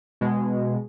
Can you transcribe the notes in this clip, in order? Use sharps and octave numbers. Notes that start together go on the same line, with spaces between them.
B2 G#3